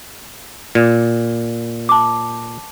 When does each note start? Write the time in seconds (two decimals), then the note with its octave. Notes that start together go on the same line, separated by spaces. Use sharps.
0.75 A#2
1.89 A5 D6